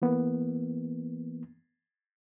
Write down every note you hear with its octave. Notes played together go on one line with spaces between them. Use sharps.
E3 A#3 B3